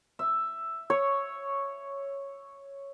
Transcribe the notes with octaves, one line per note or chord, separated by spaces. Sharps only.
E5
C#5